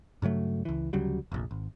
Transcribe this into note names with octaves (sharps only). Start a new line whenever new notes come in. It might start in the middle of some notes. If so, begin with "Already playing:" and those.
G2 C#3 F#3 A3
C#2 E3
D2 C#3 F#3 G3
F1 A#1
G#1